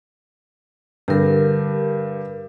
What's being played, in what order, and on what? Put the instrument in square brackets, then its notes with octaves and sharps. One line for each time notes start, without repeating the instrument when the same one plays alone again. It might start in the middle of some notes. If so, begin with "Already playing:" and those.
[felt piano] G2 D3 [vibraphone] G4 A#4